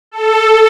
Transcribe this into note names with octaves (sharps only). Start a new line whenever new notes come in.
A4